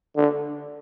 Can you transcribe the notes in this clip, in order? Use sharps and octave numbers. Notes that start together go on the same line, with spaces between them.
D3